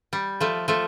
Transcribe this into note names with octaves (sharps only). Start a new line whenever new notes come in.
G3
F3 A3
F3 A3